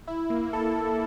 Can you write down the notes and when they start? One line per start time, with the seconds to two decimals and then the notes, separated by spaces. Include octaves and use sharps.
0.08 E4
0.30 A#3
0.53 A4